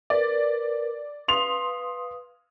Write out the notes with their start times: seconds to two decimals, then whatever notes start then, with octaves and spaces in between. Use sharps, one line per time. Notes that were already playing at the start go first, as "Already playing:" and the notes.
0.10 A#4 B4 D5
1.28 B4 F5 C6 D#6 F7